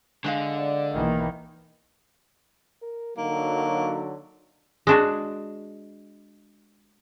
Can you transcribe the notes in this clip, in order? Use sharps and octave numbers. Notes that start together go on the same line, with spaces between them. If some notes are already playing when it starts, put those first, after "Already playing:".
D3 G#3 D#5 F5
D5
B1 D#3 E3 A#3
A#4
D3 F#3 A#3 D#4
G#3 D4 F#4